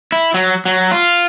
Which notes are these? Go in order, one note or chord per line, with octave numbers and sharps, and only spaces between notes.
E4
F#3
F#3
F4